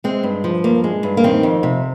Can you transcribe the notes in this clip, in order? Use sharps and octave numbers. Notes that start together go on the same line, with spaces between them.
G#3 C4
G2
F3
G2 A#3
G#3
G2
A#3
D#3 C4
F2
C3